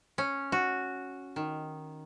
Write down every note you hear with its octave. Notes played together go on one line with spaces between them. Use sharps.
C#4
F#4
D#3